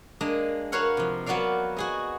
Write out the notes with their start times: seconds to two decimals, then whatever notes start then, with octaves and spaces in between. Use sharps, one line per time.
0.21 G#3 A#3 D4 D#5 A#5
0.72 F#4 A#4 B4 C#5 F5 F#5
0.97 C3 F3
1.26 F#3 B3 F#4 A#4 D5 F5
1.77 F#4 G#4 D#5